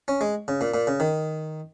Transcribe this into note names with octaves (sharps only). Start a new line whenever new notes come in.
C#4
G#3
C#3
A#2
A#2
C#3
D#3